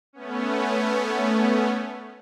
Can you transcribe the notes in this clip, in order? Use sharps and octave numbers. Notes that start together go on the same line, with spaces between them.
A3 B3 C#4